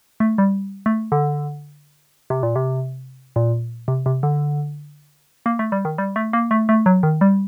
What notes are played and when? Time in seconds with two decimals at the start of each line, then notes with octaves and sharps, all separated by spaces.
0.20 A3
0.38 G3
0.86 A3
1.12 D3
2.30 C3
2.43 A#2
2.56 C3
3.36 A#2
3.88 C3
4.06 C3
4.23 D3
5.46 A#3
5.59 A3
5.72 G3
5.85 D#3
5.98 G3
6.16 A3
6.33 A#3
6.51 A3
6.69 A3
6.86 F#3
7.03 D#3
7.21 G3